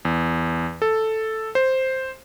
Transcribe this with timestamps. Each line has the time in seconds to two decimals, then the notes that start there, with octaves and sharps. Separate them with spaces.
0.05 E2
0.82 A4
1.55 C5